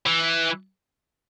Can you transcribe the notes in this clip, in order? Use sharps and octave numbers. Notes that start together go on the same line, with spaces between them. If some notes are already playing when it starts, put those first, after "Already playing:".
E3